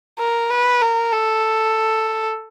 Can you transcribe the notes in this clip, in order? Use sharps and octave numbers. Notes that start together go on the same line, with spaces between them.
A#4
B4
A#4
A4